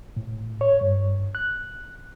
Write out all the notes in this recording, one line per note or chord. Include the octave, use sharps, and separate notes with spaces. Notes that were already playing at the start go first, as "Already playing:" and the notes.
A2
C#5
G2
F#6